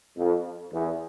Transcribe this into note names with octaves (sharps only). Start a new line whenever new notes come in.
F2
E2